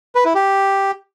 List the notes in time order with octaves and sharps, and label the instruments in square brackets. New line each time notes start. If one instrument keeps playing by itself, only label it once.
[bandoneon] B4
E4
G4